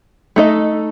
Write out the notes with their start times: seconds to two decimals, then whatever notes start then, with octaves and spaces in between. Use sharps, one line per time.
0.36 A3 D#4 A4 D#5